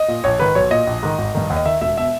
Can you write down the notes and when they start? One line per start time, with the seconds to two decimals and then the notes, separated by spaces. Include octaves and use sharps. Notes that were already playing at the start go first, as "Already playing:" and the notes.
Already playing: D#5
0.08 A#2
0.24 A#1 C#5
0.39 G#2 D#3 B4
0.55 B1 C#5
0.71 A#2 D#5
0.87 A#1
1.03 G#2 D#3
1.18 G#1
1.35 G2 D#3
1.50 D#2
1.56 D#5
1.66 D#3 E5
1.81 E1 E5
1.98 B2 E5